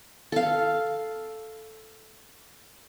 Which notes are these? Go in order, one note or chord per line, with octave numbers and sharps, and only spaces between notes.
A4 F5